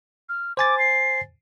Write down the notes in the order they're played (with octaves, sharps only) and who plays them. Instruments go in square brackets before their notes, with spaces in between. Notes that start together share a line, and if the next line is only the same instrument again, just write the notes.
[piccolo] F6
[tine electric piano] C5 G#5 A6 [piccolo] D6
[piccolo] C7